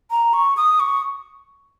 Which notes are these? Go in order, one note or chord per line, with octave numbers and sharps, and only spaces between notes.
A#5
C#6
D#6
C#6